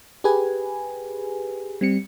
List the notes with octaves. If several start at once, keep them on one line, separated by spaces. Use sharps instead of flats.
G4 G#4 B4 G#5
G3 C4 C#7